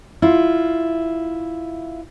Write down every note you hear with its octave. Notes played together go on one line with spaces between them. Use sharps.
E4 F4